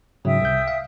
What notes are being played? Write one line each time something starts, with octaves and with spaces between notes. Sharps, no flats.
G#2 C#3 F#3 E5 G5 D#6
C2 G6
F5